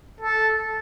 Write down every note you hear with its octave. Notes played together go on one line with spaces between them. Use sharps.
A4